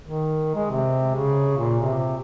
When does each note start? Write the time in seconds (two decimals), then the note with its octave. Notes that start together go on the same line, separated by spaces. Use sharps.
0.04 D#3
0.55 G#3
0.70 C3
1.15 C#3
1.57 A#2
1.81 C3